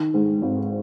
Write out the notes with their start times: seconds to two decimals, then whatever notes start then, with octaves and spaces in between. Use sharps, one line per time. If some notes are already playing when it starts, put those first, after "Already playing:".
Already playing: D#3
0.14 G#2
0.42 G#1